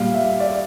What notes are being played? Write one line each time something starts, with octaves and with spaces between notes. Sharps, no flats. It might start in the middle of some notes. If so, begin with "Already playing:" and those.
Already playing: A#2 G3 F5
E5
D5